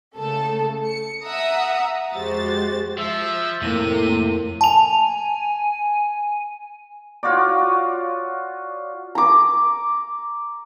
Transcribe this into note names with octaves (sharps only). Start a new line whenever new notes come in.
C#3 A3 A4
C#7
E5 F#5 A#5 D#6
F2 G#3 F#4 G4 C5 A6
F3 E5
F2 A2 C3 A3 A#3 D#7
G#5 A5 F7
F4 F#4 C#5 D5
A#5 D6